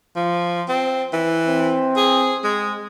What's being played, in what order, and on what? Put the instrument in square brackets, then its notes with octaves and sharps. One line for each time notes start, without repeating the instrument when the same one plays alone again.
[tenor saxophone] F3
C4
E3
[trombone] C4
[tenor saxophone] G#4
G#3